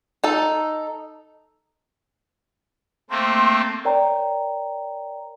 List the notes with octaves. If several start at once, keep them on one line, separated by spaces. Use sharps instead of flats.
D#4 A4
A3 A#3 C4 C6
A#4 C#5 D5 G5 A#5